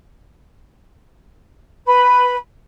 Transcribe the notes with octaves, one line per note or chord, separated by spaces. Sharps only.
B4 B5